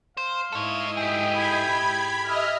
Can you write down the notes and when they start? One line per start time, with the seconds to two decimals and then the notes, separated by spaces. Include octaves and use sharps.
0.17 C5 F5
0.52 G#2 E4 A4 C#5 D#5
0.97 G4 G#4 G5
1.31 B5 G#6
2.22 D#5 E5 F6